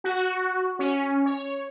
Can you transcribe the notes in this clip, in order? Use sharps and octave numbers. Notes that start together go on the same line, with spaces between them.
F#4
C#4
C#5